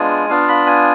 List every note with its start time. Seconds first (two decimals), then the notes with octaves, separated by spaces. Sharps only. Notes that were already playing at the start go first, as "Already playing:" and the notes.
Already playing: G#3 B3 D4 F4 G#5
0.29 B3 D4 F4 F5
0.48 B5
0.67 G#5